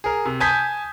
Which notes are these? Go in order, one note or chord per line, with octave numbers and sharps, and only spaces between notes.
G#4 A#4
C3
G#5 A5 D#6 G6 G#6 B6